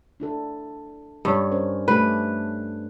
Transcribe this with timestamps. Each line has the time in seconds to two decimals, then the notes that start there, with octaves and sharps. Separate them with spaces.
0.20 D4 E4 A4
1.25 G2 C#4 C#5
1.52 C#4 A#4 C5
1.88 A3 G4 A4 B4